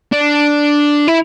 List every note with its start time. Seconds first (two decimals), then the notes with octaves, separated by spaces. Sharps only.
0.13 D4
1.08 E4